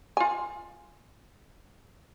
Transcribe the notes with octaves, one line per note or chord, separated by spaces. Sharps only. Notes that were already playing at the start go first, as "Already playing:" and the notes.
F4 G#5